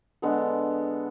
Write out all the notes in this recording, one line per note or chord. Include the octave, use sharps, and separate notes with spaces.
D3 G#3 B3 A4